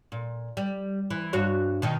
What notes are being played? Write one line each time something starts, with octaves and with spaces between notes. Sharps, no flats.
A#2
G3
E3
G2 F#4 C#5
B2 D#3 D#4